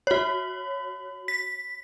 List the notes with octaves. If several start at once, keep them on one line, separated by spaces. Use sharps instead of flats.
F#4 C#5
B6